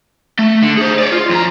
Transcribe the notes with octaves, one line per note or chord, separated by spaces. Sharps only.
A3
D3
G#4 C5
C#5 D5
F4
F2 A#5